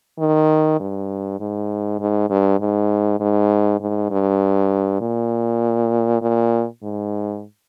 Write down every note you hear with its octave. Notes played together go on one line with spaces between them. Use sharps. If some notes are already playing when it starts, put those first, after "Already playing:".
D#3
G2
G#2
G#2
G2
G#2
G#2
G#2
G2
A#2
A#2
G#2